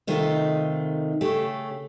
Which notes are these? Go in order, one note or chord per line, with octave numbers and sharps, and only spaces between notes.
C3 D#3 A3 D#4 F4
C#3 A3 G4